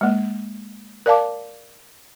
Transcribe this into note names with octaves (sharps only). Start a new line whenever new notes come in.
G#3 A#3
A#4 D5 F5 A5 D6